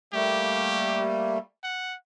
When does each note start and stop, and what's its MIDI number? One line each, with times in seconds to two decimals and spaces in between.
0.13 1.38 55
0.13 1.38 57
0.13 1.38 58
0.13 1.10 67
1.64 1.96 78